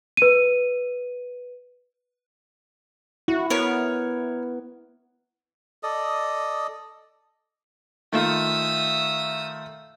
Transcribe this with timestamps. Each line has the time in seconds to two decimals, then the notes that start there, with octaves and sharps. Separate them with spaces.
0.17 B4 D#7
3.28 E4 F#4
3.50 B3 A#4 C#5
5.83 A4 D5 D#5 D#6
8.13 D#3 A3 F4 E5 D#6